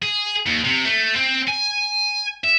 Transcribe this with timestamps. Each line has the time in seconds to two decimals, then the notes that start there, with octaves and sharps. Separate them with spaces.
0.02 G#4
0.46 D#2
0.64 C3
0.85 A3
1.16 C4
1.48 G#5
2.44 E5